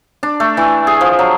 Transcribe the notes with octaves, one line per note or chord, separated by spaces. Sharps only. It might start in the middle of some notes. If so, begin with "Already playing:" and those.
D4
A3
E3
G#4
F3
F#3